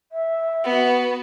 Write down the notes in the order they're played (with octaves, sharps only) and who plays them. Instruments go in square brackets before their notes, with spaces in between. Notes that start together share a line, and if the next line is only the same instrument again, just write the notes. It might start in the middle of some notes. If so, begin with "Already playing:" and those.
[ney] E5
[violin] B3 F#4